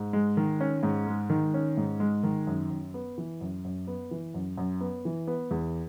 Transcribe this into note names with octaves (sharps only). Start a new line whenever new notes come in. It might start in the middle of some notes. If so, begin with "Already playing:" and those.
Already playing: G#2
G#3
D#3
C#4
G#2
G#3
D#3
C#4
G#2
G#3
D#3
F#2
F#2
B3
E3
F#2
F#2
B3
E3
F#2
F#2
B3
E3
B3
E2